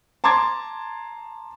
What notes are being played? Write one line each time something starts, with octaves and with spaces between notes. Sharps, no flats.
A5 A#5 C6 D6 G#6 A6